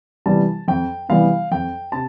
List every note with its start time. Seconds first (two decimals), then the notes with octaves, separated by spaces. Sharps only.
0.26 C3 E3 G3 B3 A5
0.68 F2 G5
1.09 C3 E3 G3 B3 F5
1.51 F2 G5
1.92 C3 A5